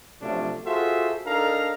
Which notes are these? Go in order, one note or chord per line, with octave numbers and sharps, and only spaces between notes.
C3 F3 F#3 A3 C#4 D4
F4 F#4 G#4 A4 C5 E5
D4 D#4 A4 A#4 F5 A#5